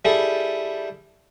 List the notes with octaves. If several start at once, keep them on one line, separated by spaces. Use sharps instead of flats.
G3 E4 G#4 A4